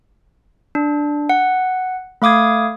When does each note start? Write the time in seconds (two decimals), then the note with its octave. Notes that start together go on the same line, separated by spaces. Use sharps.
0.75 D4
1.29 F#5
2.22 A3 F5 D6 D#6 G#6